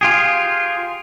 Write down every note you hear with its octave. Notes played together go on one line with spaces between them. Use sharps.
F4 G4 G#4